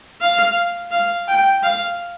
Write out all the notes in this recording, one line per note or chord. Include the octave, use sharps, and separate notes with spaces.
F5
F5
G5
F5